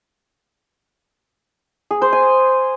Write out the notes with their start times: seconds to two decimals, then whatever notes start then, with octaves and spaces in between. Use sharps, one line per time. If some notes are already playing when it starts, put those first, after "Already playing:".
1.91 G#4
2.02 C5
2.13 G#5